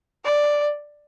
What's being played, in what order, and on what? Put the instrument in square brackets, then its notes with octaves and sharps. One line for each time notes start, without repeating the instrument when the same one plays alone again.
[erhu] D5